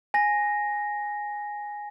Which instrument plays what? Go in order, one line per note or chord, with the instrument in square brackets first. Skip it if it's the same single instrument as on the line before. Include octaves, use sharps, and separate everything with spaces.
[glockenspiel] G#5 A#6